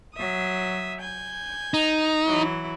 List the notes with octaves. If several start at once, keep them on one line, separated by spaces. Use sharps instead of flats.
F#3 E5 D#6
G#5 G6
D#4
E3 F#3 E4